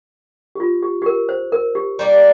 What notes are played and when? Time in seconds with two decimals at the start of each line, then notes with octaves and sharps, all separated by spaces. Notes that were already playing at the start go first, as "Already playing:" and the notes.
0.55 G4
0.60 F4
0.83 G4
1.02 G4
1.06 A#4
1.29 C5
1.52 A#4
1.75 G4
1.99 G3 A#3 D4